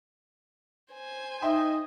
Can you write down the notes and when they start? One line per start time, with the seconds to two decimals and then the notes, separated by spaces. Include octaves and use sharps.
0.93 C5 G#5
1.42 D#4 D#5 E5 G5 C6